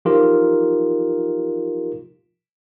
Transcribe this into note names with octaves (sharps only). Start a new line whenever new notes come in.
F3 D#4 F4 G4 A#4